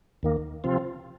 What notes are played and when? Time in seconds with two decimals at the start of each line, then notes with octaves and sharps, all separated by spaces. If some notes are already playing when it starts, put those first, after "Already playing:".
0.23 D#2 D#3 A#3
0.64 C3 F3 C4 F4